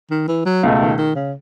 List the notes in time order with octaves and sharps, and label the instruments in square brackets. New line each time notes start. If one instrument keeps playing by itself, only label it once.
[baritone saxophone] D#3
E3
F#3
[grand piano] C#2 B2 A3
[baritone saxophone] D#3
D#3
C#3